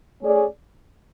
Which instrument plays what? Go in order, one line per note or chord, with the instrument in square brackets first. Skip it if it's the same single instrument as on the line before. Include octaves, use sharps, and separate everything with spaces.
[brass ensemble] A3 C#4 G#4 D5